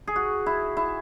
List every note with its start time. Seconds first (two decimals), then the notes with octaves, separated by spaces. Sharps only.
0.07 G#4
0.16 F#4
0.46 E4
0.77 E4